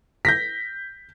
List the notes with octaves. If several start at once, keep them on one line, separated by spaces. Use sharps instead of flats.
G6 A#6 B6